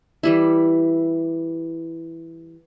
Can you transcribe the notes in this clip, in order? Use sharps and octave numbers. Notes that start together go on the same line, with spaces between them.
E3 G3 E4